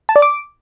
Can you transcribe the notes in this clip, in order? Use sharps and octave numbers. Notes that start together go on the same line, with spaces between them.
A5
D5
D6